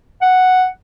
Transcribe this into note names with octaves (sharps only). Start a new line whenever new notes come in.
F#5